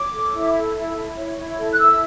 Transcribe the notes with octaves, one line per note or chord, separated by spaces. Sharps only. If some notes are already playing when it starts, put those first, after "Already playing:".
Already playing: C#5 D6
A4
E4
A4
E4
E4
C#5
E4
A4
F#6
E4 E6